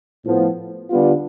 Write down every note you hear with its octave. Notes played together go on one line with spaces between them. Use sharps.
A2 F3 B3
D3 G3 B3 D4 F4